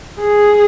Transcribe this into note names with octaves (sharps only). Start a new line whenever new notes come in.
G#4